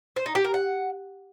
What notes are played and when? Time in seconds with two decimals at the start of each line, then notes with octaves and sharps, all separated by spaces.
0.16 C5
0.26 D#4
0.35 G4
0.44 A#4
0.54 F#5